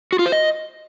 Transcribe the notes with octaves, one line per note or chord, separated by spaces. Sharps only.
F#4
F4
C5
D#5